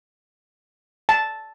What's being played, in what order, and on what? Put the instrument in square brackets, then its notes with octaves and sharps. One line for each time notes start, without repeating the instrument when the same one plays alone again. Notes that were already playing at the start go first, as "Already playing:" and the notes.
[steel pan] A5